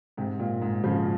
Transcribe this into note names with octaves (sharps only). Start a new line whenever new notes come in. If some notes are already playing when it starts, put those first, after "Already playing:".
G#2 C3
A#2
G#2
C#3 F3